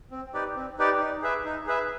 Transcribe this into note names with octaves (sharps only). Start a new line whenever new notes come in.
C4
D#4 G4 B4 D5
C4
D#4 G4 B4 D5
D#4
G#4 B4 E5
D#4
G#4 B4 E5